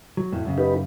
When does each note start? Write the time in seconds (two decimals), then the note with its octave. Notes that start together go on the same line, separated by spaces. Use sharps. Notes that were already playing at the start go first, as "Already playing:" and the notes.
0.17 F#3
0.32 F2 A2
0.45 F#2 C#3
0.58 D#4 G4 B4